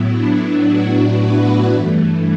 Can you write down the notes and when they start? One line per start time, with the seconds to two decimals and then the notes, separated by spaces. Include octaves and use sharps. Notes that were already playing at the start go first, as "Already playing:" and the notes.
Already playing: A2 F#3 B3 E4
0.10 D4
0.64 F#4
1.17 B4
1.71 G2 E3 A3